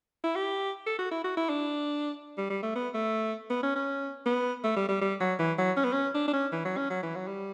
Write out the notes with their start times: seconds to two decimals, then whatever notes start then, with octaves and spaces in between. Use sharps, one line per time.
0.24 E4
0.36 G4
0.86 A4
0.99 F#4
1.11 E4
1.24 F#4
1.37 E4
1.49 D4
2.37 G3
2.50 G3
2.62 A3
2.75 B3
2.94 A3
3.50 B3
3.63 C#4
3.75 C#4
4.26 B3
4.64 A3
4.76 G3
4.89 G3
5.01 G3
5.20 F#3
5.39 E3
5.58 F#3
5.77 C#4
5.84 B3
5.93 C#4
6.14 D4
6.28 D4
6.33 C#4
6.52 E3
6.65 F#3
6.77 C#4
6.90 F#3
7.03 E3
7.15 F#3
7.27 G3